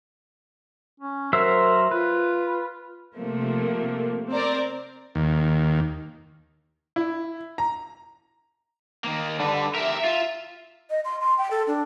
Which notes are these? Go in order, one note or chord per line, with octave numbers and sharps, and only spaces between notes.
C#4
F#3 A#4 C5 E5
F4 B4
C3 F3 A3 A#3
C4 A#4 D5
D#2
E4
A#5
D#3 A#3
D3 G3 B4
G4 A#4 E5
F4
D#5
C6
C6
G5
A4
D4